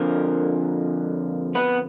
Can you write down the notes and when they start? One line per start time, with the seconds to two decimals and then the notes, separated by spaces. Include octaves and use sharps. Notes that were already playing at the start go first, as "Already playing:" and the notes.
Already playing: F2 D3 F3 A#3 A#4
1.55 B3 B4